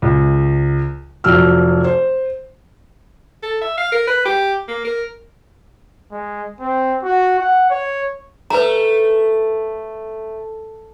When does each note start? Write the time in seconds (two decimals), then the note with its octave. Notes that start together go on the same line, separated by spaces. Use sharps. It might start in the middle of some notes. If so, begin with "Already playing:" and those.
0.02 C#2
1.24 F1 F3 F#3 E6 F6
1.84 C5
3.43 A4
3.61 E5
3.77 F5
3.92 A#4
4.07 B4
4.25 G4
4.68 A#3
4.84 A#4
6.12 G#3
6.60 C4
7.03 F#4
7.40 F#5
7.70 C#5
8.50 A3 B4 A#5